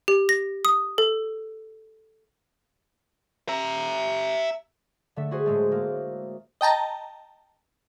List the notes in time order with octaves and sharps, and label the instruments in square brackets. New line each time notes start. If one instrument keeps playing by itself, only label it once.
[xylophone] G4
A#6
D#6
A4
[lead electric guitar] E5 A#5
[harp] D3 A3 E5
F#4 G#4 C5
A2 G#3 A3
A#3
[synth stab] D#5 G5 A5 A#5